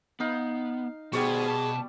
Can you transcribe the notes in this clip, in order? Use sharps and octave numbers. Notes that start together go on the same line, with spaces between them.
B3 D#4 F5
B2 G3 F#4 G#4 C5 D5 F#5 C#6
A5